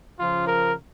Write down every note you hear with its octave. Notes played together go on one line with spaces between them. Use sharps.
C#3 F3 F4
A#4